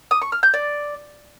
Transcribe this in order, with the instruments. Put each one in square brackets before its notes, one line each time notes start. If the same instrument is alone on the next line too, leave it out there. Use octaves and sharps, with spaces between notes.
[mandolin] D#6
C#6
F6
G6
D5